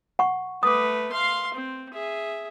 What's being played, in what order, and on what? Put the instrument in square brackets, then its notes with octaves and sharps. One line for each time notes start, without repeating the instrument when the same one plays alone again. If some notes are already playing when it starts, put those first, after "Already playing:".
[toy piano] F#5 C#6
[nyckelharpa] A3 B4 [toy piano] D6 D#6
[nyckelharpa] F5 C6
C4
G#4 E5